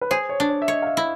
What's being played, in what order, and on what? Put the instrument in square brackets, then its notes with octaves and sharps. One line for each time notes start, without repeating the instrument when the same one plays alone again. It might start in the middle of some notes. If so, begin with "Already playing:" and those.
[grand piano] B4
[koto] G#4 [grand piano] C5
[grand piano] C#5
[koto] D4
[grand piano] C#5
E5
[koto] C#5 [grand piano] D#5
[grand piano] F5
E5
[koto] E4